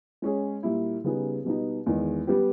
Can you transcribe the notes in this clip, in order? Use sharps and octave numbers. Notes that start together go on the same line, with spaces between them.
G#3 C#4 G#4
A#2 G3 A#3 E4
C#3 G3 B3 D#4 G#4
B2 G3 B3 D#4
E2 D#3 G#3
G3 B3 G4